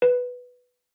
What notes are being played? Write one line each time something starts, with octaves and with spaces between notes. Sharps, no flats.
B4